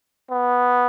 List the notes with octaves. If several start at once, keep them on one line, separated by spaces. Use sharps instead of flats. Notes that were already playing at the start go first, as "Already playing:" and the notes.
B3